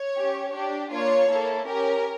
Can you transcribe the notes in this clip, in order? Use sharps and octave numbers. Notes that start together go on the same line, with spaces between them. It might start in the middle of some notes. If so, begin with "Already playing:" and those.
Already playing: C#5
C#4 G4
D4 G4
A#3 D4 F4 C#5
A#3 E4 A4
C#4 G4 A#4